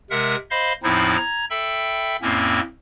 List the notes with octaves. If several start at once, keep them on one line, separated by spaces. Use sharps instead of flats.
C3 G#3 A#4 E5 F#5
C5 D#5 F5 B5 C6
E2 A2 F3 C4 D#4 E4
A#5 G#6
A4 E5 G5 B5
F2 A2 A#3 C4 C#4